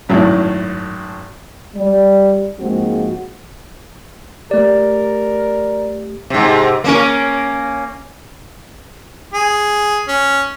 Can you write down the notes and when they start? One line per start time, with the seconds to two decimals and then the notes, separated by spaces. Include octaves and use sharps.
0.09 G#1 F#2 A2 F#3 E4
1.76 G3 D5
2.59 G#2 F3 G#3 A#3 C4 F#4
4.51 A3 G4 A#4 D5
6.30 G#2 C3
6.84 A#3 C#4 A#4
9.33 G#4
10.08 C#4